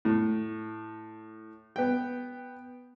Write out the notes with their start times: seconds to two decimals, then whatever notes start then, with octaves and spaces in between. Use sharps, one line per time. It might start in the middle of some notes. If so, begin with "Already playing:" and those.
0.05 A2
1.76 B3 G5